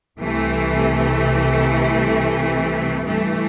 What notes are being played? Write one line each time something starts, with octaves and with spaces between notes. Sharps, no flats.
C2 C3 E3 A3
G2 E3 A3